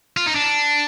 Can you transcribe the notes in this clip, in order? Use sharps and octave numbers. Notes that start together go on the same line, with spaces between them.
F4
D#4
D4